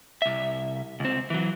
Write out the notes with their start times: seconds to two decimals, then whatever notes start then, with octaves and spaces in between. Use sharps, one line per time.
0.22 C2 E5
1.00 C#2 C4
1.30 E3 F#3